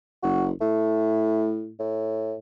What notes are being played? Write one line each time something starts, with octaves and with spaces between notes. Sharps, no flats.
F#1 F#4
A2 A3
A2